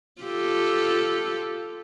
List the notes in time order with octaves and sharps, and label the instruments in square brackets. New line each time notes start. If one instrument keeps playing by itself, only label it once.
[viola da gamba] F4 G4 A4